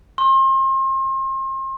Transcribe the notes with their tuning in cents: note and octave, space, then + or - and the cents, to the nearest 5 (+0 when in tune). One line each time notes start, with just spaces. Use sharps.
C6 +35